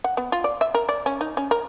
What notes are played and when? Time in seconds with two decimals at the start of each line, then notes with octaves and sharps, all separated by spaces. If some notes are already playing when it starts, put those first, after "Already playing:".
0.04 F#5
0.17 B3
0.32 F4
0.44 D5
0.61 E5
0.75 A#4
0.89 D5
1.06 C#4
1.21 D#4
1.37 C#4
1.51 A#4